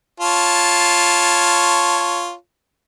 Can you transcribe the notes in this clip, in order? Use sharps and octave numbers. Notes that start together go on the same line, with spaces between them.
F4 C#5 A5